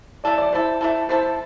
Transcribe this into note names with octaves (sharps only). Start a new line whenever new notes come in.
A3 E4 A4 D5
D5
A3 E4 A4 C5
A3 E4 A4
A3 E4 A4 C5